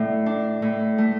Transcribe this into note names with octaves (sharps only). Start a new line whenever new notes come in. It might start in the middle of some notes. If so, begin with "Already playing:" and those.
Already playing: A2 A3 D4
D4
A2
A3